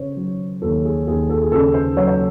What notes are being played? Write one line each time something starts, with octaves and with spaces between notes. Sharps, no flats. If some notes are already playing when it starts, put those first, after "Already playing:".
Already playing: C#3 C5 C#5
F#3
D#2 A4
G#4
D#2 G#4
A4
G#4
C#3 A4
C5
F#3 C#5
C#5